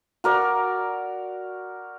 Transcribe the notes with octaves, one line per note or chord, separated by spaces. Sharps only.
F#4 A#4 D5